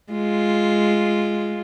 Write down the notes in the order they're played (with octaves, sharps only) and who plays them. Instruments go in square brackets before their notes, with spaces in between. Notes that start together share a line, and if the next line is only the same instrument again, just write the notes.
[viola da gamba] G#3 F4